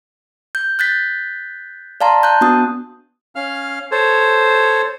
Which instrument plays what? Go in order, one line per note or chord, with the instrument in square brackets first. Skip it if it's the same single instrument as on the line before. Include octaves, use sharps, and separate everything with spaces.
[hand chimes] G6
F#6 G6 A6 B6
D5 F5 A5 A#5 C6
A5 F#6 G6
B3 D4 F#4 D#6
[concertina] C#4 F5 F6
A4 C5 C#5